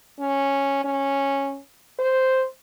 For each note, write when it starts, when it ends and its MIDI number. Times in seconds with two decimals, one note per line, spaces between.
0.19 0.79 61
0.84 1.59 61
1.99 2.45 72